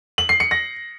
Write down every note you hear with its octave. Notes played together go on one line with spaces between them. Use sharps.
F#7
C7
C#7
A#6